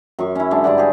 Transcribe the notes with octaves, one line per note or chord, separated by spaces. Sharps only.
F#2 C#6
C#4 E4
D3 G#3 D4
G2 D3 D5 F#5
G4 G#4